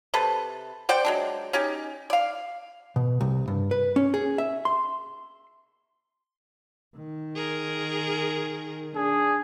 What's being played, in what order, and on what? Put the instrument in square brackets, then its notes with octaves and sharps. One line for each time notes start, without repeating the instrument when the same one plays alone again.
[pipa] C3 A4 B4
C5 D5 F#5 G5
F#3 G#3 D4
C#4 D#4 G4 G#5
D5 F5
[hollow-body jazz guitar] B2
C2
G2
B4
C#4
G#4
E5
C6
[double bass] D#3
[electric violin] G#4 A#4
[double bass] D4 [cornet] G#4